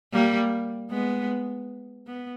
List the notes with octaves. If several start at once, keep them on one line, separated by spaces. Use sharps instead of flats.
G3 A#3
G#3 B3
B3